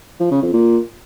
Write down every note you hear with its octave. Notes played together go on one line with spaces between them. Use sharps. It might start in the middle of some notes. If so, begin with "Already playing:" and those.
F3
C#3
F2
A#2